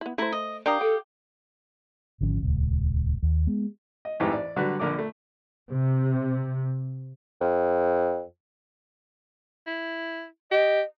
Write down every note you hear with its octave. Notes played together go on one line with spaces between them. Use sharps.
B3 E4
A3 E4 C5 A#5
D#5
D4 G4 A#4 F5 A#5 D#6
A4 G5
G#1 D3 F3 C#4
D#1 C#2
D#2
G#3 B3
D#5
A1 F2 G#2 E3 G4
D5
D3 F#3 G3 F#4 B4
A#1 D3 A#4 D5 D6
A3
C3
F2
E4
G4 D#5